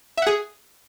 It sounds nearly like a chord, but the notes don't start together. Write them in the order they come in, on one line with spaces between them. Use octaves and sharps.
E5 F#5 G#4